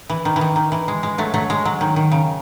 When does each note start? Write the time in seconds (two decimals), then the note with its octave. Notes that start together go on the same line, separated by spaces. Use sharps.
0.10 E3
0.25 D#3
0.36 E3
0.41 D#3
0.56 D#3
0.72 E3
0.88 G#3
1.03 G#3
1.18 F#3 A3
1.34 F#3 A3
1.50 G#3
1.65 F#3
1.81 D#3
1.96 D#3
2.12 C#3